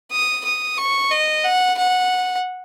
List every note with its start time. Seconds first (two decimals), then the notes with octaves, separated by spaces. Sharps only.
0.12 D#6
0.45 D#6
0.78 C#6
1.11 D#5
1.44 F#5
1.77 F#5